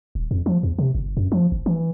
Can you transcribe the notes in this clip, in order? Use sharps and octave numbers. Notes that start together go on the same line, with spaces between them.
D#1
F2
F3
E2
C3
G1
F#2
F3
G1
E3